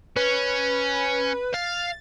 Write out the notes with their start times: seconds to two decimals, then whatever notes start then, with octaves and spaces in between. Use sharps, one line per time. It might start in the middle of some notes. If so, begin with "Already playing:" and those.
0.16 C#4 B4
1.54 F5 A6